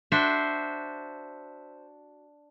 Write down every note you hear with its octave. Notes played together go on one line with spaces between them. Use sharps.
D4 F#4 C5 E5